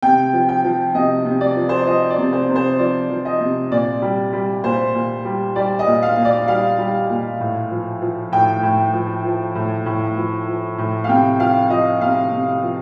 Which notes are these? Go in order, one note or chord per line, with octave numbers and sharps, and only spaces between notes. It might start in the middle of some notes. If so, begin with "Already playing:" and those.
C3 G5
F3
G5
F3
C3 D#5
C3
D5
F3
C5
D5
F3 D#5
D5
C3
C5
C3
C5
F3 D5
F3
D#5
C3
A#2 D5
G3
G3
A#2 C5
A#2
G3
G3 D5
D#5
A#2
F5
A#2
D5
G3 F5
G3
A#2
A2
F3
F3
A2 G5
A2
F3
F3
A2
A2
F3
F3
A2
F5
C3 G5
F3 F5
F3 D#5
C3 F5
C3
F3